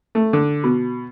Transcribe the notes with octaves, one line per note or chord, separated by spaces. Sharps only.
A3
D3
B2